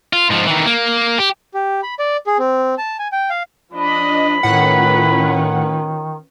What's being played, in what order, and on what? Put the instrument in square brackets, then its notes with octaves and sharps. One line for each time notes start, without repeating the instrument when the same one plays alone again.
[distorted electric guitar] F4
G#2 F3
D#3 E3
A#3
G4
[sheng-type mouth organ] G4
B5
D5
G#4
C4
A5
G#5
G5
F5
[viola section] F3 D4 D#5 [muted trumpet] B5
[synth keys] A2 F#5 [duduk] D#3 [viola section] C#4 F4 B4